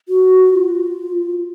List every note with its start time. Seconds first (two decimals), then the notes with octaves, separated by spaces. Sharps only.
0.09 F#4
0.54 F4